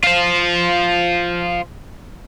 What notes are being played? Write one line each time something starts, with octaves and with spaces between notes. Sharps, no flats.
F4 C5